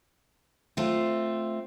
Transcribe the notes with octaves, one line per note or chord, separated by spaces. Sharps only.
A3 C4 F4